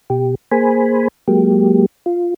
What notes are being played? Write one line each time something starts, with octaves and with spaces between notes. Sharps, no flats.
B2 G4
A#3 G#4 C5 G#5 B5
F#3 G#3 A#3 G4
F4